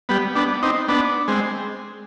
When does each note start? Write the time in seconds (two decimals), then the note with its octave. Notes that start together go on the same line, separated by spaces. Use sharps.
0.09 G3 B3
0.36 B3 D4
0.63 C4 D#4
0.89 B3 D4
1.28 G#3 C4